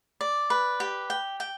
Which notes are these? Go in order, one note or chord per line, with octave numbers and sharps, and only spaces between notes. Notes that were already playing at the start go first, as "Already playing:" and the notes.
D5
B4
G4
G5
G5